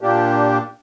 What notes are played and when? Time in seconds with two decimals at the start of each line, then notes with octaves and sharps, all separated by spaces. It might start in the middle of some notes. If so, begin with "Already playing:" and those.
0.01 A#2 A#3 D4 G4